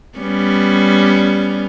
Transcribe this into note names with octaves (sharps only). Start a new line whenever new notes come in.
G3 B3 C#4